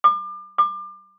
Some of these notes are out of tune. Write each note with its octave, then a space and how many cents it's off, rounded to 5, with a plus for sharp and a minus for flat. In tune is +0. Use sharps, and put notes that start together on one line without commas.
D6 +35
D6 +30